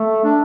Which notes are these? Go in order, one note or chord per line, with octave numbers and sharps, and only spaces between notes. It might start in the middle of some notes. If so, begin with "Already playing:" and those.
Already playing: A3
D4